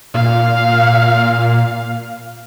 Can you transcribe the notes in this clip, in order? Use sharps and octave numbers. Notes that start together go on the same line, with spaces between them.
A#2 F5